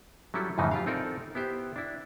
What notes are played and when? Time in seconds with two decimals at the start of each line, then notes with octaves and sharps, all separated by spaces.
0.34 F#3 G3 C#4 E4 A4
0.58 F#2 A2 C#3 E3 F3 D#4
0.71 F4 G4 F5
0.86 C4 D#4 F4 A4 A#4 D5
1.35 B3 E4 G4 C5
1.76 D4 E4